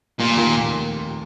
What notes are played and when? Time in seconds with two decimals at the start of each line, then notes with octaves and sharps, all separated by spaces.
0.20 F1 A#2
0.36 D#2 D#3 A#3 F4